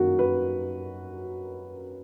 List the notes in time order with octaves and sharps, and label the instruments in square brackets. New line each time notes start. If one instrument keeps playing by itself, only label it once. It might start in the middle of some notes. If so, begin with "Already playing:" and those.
Already playing: [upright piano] F#2 D#3 F#3 A#3 F#4
B4